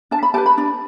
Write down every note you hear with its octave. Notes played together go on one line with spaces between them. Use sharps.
D4 A5
B5
G4 B4 A5
B5
D4